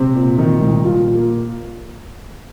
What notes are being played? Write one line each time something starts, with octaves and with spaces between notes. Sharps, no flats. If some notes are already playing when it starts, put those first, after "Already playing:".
Already playing: C3 C4
A#2
A#2 D#3 D#4
C2
A#2 F3 F4
A#2
A#3